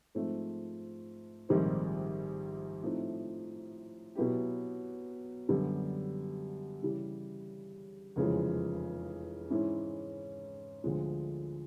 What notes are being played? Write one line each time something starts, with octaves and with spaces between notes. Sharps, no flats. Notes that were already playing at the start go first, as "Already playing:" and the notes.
G#2 F3 A3 C4
A#1 G#2 D#3 G3 C4
A2 F3 A3 C4 D#4
B2 F#3 B3 E4 G4
F#2 D3 G3 B3
C#3 E3 G3
F1 E2 C#3 F3 G#3
G#2 E3 G#3 C#4 E4
D2 D3 F3 G#3